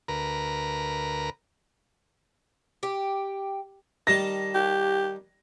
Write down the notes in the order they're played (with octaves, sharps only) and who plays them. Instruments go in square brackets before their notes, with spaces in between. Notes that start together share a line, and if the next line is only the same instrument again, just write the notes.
[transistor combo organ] D2 A#4 B4 A#5
[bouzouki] G4
[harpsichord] D#3 G3 A5 [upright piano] A#6
[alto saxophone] G4